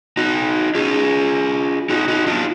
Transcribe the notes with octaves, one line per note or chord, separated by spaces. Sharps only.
D#4 F#4
F4 G#4
D#4 F#4
D#4 F#4
D4 F4